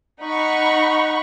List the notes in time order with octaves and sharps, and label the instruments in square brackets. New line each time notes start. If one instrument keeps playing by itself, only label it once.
[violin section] D#4 F#5 B5 C#6